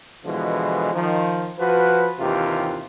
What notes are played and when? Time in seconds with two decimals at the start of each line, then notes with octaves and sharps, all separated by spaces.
0.25 B2 D3 E3 F3 G#3
0.93 D#3 F3
1.59 F3 F#4 B4
2.19 D#2 C3 E3 F4 G4